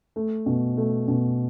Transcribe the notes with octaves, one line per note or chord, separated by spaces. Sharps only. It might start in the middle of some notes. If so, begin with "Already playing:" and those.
A3
B2
A3
B2